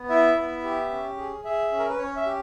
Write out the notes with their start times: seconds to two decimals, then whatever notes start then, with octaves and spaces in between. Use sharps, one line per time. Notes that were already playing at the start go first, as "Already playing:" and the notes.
Already playing: B3
0.09 E4 E5
0.36 B3
0.64 G4
0.91 C#4
1.17 G#4
1.45 G#4 E5
1.72 C#4
1.79 A#4
1.89 B4
1.98 C#4 C#5
2.16 E5
2.26 G4